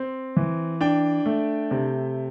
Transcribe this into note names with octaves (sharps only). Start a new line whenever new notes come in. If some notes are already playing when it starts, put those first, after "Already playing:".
Already playing: C4
E3
D4 G5
A3
C3